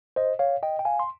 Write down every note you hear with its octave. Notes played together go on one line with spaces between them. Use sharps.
C5 D#5
C#5 F5
D#5 G5
G5
F5 G#5
C6